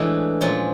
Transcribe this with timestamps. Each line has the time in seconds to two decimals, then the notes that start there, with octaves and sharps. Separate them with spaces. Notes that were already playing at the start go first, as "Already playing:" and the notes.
Already playing: A2 E3 G#3 D4
0.41 A#2 F3 G#3 C#4